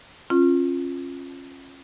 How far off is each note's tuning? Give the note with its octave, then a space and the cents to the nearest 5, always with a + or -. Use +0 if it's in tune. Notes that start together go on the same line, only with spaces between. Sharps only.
C#4 -30 F4 +0